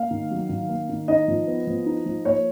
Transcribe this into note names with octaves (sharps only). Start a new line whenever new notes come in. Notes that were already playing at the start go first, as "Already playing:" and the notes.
Already playing: A#3 F5
D#3
F#3
D#3
A#3
D#3
D#4 D#5
F3
B3
F3
D#4
F3
A#3 C#5